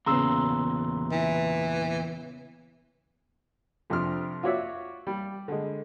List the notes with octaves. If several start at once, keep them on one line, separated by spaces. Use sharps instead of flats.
E2 A#2 C#3 B3 A#5 C6 E6
E3
F2 C3 D4 F6
F4 F#4 C#5 D5 E5
G3
D3 G#3